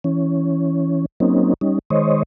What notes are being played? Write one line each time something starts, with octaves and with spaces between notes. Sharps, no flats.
E3 C#4
F#3 A#3 C4 C#4 D#4
G3 C#4 D#4
D#3 G#3 C5 C#5 D#5